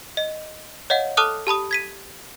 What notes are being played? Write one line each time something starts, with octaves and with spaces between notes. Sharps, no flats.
D#5
C#5 D#5 F5 F#5
A4 A5 D6 D#6 F6 F#6
G4 A5 B5 D#6
G#6 B6 D#7